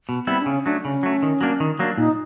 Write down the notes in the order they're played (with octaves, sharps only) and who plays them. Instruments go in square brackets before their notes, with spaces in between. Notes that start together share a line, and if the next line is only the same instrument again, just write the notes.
[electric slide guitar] B2
[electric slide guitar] G3 B3 E4 [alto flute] C4
[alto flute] D4
[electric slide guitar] C#3 [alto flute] C#4
[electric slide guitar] F#3 A3 [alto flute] D4
[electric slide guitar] C#3 [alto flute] C#4
[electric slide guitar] F#3 A3
D#3
F#3 A#3 D4
D#3
F#3 A#3 D4
[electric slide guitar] A#2 [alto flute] D#4